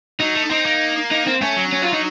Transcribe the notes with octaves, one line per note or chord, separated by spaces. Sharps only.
F#3 D#4
A3
C4 D#4
A#3
D#4
C4
A3 C#4
F#3
C#4
F4
D#4